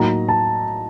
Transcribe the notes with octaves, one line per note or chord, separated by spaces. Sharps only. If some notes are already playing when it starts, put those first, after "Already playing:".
Already playing: A2 F#3 A#3 D#4 F#4 A#5
A5